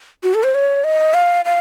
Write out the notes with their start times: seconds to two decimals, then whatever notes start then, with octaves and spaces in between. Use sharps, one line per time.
0.23 F#4
0.34 A4
0.43 C5
0.54 C#5
0.84 D#5
1.14 F5
1.45 F5